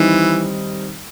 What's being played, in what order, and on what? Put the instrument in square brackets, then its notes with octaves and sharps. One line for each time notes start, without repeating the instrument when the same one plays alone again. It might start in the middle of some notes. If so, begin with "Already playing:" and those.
Already playing: [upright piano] D#3 G3 C4 D#4 [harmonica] E3